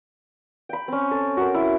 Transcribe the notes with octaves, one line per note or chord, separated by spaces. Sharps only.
G5 B5
C4 C#4
A4
F#4 A#4
E4